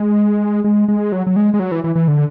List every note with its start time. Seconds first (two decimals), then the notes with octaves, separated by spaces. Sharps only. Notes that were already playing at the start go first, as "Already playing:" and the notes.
Already playing: G#3
0.64 G#3
0.88 G#3
1.12 F#3
1.27 F#3
1.36 G#3
1.54 G#3
1.59 F#3
1.72 E3
1.84 E3
1.96 E3
2.08 D3